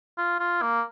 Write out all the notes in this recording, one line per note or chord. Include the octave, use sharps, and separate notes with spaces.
F4
F4
A#3